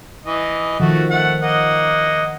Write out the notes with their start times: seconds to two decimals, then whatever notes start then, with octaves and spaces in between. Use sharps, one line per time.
0.25 E3 D#5
0.80 D#3 F3 A3 F#4
1.10 A3 F#5
1.42 A#3 D#5 F#5